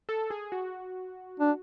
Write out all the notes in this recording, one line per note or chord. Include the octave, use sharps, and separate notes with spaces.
A4
G#4
F#4
D4